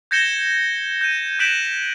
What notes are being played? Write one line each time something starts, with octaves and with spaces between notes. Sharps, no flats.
G6 G#6 A#6 C#7 E7 G7
G6 G#6 D#7
F#6 G6 B6 D7 E7 F#7